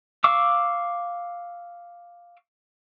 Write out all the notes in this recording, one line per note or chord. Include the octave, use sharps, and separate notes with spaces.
F5 C#6 D6 E6